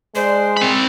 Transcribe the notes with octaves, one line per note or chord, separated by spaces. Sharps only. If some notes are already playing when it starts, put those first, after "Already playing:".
G#3 D4 C5
C4 B5